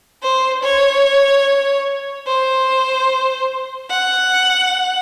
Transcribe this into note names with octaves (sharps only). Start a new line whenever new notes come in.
C5
C#5
C5
F#5